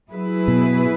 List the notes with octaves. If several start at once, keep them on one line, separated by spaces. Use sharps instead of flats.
F#3 E4 G#4 B4
B2